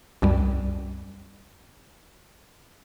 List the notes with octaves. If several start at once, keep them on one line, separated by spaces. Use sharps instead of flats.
C2 F#2 G3